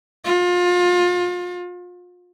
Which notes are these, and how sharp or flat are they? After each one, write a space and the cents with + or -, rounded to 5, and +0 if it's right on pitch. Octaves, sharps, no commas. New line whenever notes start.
F4 +30